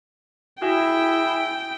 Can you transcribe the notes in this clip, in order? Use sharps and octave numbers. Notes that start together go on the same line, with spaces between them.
E4 F#4 G#4 E5 G5